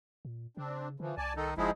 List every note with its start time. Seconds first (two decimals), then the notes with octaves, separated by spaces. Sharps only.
0.25 A#2
0.57 C#3 C4 D4
1.00 D3 E3 F3
1.18 C2 D5 G#5 A5
1.36 D#3 D#4 A4
1.58 F#1 F3 G#3 D#4 E4 G#4